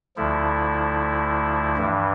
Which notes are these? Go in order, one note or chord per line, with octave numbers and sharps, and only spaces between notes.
D2 D3 F3 E4
G2 E3